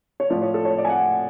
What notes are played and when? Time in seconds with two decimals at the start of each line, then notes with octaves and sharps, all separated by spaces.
0.20 C#5
0.30 A2 F3 D5
0.42 C#5
0.54 A4
0.65 C#5
0.78 D5
0.85 G#5
0.89 F#5